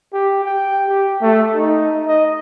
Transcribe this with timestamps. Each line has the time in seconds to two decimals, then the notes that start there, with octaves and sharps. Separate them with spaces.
0.13 G4
0.44 G5
0.88 G4
1.21 A3
1.56 D#4
2.07 D#5